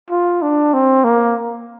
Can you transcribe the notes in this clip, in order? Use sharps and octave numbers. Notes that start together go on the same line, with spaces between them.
F4
D4
C4
A#3